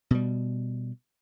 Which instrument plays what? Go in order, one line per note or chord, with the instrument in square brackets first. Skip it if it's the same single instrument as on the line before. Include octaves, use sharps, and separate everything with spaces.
[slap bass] B2 G3